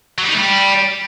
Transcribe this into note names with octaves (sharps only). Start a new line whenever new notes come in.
F#3
G3
D#4
A3
G3